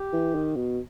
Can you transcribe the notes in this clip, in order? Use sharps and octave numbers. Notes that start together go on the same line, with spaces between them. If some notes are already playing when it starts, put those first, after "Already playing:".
Already playing: G4
E3
D#3
B2